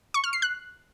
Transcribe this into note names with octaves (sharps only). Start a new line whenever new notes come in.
C#6
F6
C7
F#6